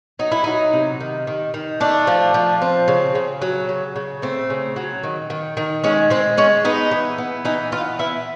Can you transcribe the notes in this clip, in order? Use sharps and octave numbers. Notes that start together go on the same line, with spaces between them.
F#3 D#4
E4
F#3 D#4
C3
D#3
D#3
D#3
A3 D4
F3
F3
C4
C#3
C#3
F#3
C#3
C#3
A3 C4
C#3
F#3
D#3
D#3
D#3
G#3 C#4
G#3 C4
G#3 C#4
B3 D#4
E3
B3
E3 D#4
B3 F4
B3 E4